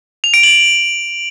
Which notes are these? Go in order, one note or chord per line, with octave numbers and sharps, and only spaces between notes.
F7
D7
F#7